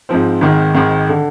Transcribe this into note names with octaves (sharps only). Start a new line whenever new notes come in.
G#2 F3 C4
G#1 G#2 D#3
G#1 G#2 D#3
D3